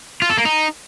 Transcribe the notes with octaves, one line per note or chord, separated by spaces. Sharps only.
F4
A4
A#3
D#4